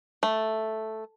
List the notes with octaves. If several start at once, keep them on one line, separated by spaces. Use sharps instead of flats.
A3